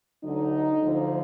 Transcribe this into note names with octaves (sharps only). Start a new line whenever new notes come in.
D2 D3 F#3 D#4
D2 D3 F3